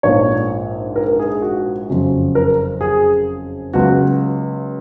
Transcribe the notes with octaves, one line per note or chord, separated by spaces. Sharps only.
A#1 G#2 F3 A#3 C#5
A#4
A#4
G#4
F#4
F#1 F2 C#3 F#3 C#4
A#4
G#4
C#2 C#3 F#3 B3 F#4